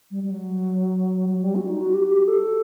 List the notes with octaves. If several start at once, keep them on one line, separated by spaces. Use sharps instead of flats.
G3
G3
F#3
F#3
G3
F#4
D#4
F#4
G4
G4
A4